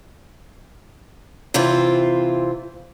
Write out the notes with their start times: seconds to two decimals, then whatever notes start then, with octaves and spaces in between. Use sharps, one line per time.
1.54 C3 E3 C4 F4 C5